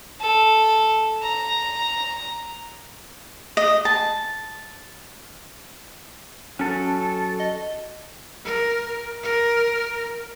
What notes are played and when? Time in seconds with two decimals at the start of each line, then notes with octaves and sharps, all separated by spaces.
0.21 A4
1.22 A#5
3.57 D#5
3.85 A5
6.59 F#3 C#4 A4
7.40 D#5
8.44 A#4
9.23 A#4